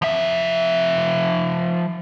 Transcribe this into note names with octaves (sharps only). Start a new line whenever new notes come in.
F3 E5